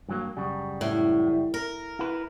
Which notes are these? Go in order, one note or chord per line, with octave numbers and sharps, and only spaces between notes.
G2 F#3 A#3
F#2 C#3 G3
A2
A#4
E4 B4